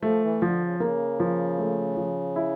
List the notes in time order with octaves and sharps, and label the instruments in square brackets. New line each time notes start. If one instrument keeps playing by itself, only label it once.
[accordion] F3 [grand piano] A3
[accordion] E3
[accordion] D3 [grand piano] F3
[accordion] C#3
[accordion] C#3 [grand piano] A#3
[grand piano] F3
A3
F3
E4